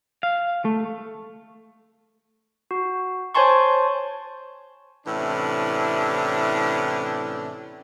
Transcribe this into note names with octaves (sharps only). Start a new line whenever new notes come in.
F5
A3
F#4
C5 C#5 G#5 A5 C6 C#6
A2 C3 E3 C#4 D4